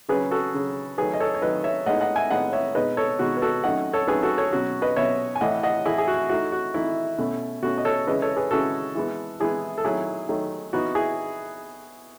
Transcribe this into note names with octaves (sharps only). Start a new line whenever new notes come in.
C#3 F#3 C#4 G#4 B4
F#4 A4
C#3 F#3 C#4
D#3 F#3 A3 G#4 B4
D#5
A4 C#5
C#5
D#3 F#3 A3 B4 D#5
C#5 E5
A2 G#3 B3 D#4 D#5 F#5
D#5 F#5
E5 G#5
A2 G#3 B3 D#4 D#5 F#5
C#5 E5
B2 G#3 D#4 B4 D#5
A4 C#5
B2 G#3 D#4 F#4
B4
F#4 A4
D#3 F#3 A3 C#4 D#5 F#5
A4 C#5
D#3 F#3 A3 C#4 G#4 B4
F#4 A4
A4 C#5
B2 F#3 C#4 F#4
B4 D#5
B2 F#3 C#4 C#5 E5
G#5
A2 E3 A3 D#5 F#5
D#5 F#5
A2 E3 A3 E4 G#4
G#4
F#4
E3 A3 D#4 F#4
F#4
E3 A3 D#4 E4
B2 A3 C#4
B2 A3 C#4 F#4
D#5
A4 C#5
C#3 E3 G#3 C#4 B4 D#5
A4 C#5
G#4 B4
C#3 E3 G#3 C#4 F#4 A4
E3 G#3 B3
E3 G#3 B3 E4 G#4
A4
D#3 F#3 A3 D#4 E4 G#4
D#3 F#3 A3 D#4
E3 B3 D#4 F#4
E4 G#4